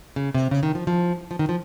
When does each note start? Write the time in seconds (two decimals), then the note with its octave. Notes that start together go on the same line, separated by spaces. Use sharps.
0.16 C#3
0.34 C3
0.51 C#3
0.63 D#3
0.75 F3
0.87 F3
1.31 F3
1.39 D#3
1.49 F3